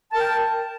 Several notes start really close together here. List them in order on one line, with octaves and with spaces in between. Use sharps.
A5 A#4 G5